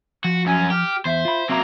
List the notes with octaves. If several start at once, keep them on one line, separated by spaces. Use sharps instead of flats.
F3 F#4
F#2 C#4 G#5
G4 F6
E2 C5 E5
F4 B5
F#3 A#3 C4 E5 A#5